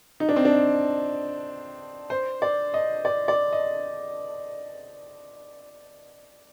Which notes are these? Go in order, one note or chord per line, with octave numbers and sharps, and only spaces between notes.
D#4
D4
C4
D4
C5
D5
D#5
D5
D5
D#5